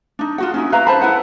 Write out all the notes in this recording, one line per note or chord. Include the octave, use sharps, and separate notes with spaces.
D4 D#4
F4 F#4 F#5
C#4 D#4 E4
B4 E5 F5 A#5
C5 A5 B5
E4 B4 F#5